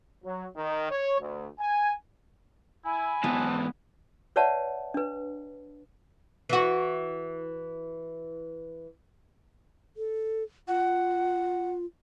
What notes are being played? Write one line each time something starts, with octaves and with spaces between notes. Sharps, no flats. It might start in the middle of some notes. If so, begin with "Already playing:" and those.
F#3
D#3
C#5
D2
G#5
E4 G#5
G#2 E3 B3 C4 F#4 A5
B4 C#5 D5 E5 F#5 A5
D4 B4
E3 F#4
A4
F4 F#5